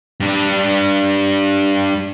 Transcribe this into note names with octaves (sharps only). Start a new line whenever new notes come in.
G2 D4